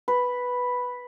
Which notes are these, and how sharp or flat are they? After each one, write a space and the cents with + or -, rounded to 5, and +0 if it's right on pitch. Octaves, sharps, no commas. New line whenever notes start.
B4 +0